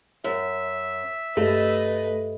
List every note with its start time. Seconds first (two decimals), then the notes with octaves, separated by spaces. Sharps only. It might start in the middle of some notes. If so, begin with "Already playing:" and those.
0.24 F#2 E5
1.37 G2 A3 B4 D#5